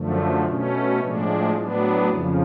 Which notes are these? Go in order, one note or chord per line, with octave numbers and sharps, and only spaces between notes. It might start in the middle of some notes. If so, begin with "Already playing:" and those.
Already playing: F#2 D3 F3 A3
B2 A3 C#4
A2 F3 G#3 D4
A2 F#3 B3 D4
F2 C#3 F3